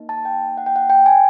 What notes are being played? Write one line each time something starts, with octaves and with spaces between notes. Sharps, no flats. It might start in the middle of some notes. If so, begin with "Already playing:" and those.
Already playing: A#3 D#4
A5
G5
F#5
G5
F#5
G5
G#5